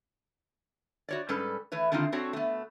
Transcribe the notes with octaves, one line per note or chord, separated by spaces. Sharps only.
F#4 C#5 D5
G#2 G3 C#4 A4 B4
E3 A3 B4 C#5
D3 D#3 A3 C4 D#4 F4
C4 D4 F#4 A4 C#5
A3 B3